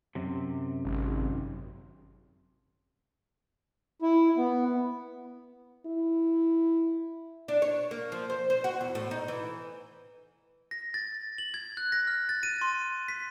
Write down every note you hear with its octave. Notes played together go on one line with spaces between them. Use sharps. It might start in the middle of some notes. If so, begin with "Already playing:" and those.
F#2 C3
G#1
E4
B3
E4
D4
C#5
A#3
F3
C5
C5
F#4
E2
A2
D#4
E3
A#6
A6
F#7
G#6
F#6
A#6
F6
A6
D#7
C6
B6